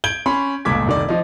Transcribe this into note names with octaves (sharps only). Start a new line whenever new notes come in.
G6 G#6 D7 G7
C#4 B5 C6
G1 C#2 A#2 D6 G#6 B6
F1 D#3 D5
F3 D#4